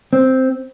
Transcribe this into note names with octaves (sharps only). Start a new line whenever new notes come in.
C4